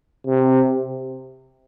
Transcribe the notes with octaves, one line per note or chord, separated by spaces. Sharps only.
C3